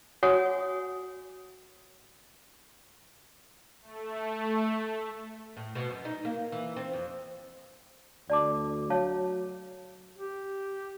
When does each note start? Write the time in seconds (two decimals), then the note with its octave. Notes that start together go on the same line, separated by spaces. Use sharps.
0.23 F#4 C#5 F#5 G#5 D#6
3.82 A3
5.57 A2
5.75 B2
5.90 F#2
6.05 D#4
6.25 A#3
6.52 E3
6.76 C4
6.93 F2
8.30 D2 D5 A5 D6
8.90 F#3 C#5 F5 A5
10.17 G4